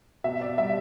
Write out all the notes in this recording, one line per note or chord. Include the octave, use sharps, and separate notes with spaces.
B2 E5
D5
G3 E5